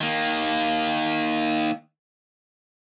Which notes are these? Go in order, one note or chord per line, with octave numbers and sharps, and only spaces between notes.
D#3 A#3